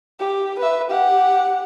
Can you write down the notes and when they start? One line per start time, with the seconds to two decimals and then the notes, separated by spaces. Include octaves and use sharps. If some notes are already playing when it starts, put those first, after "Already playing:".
0.20 G4
0.59 B4 E5
0.90 G4 F#5